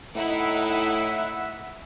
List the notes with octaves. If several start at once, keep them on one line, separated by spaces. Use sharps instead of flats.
A2 D#4 E4 E5 F#5